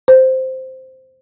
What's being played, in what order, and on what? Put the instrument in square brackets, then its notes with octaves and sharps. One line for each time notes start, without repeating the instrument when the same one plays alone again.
[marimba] C5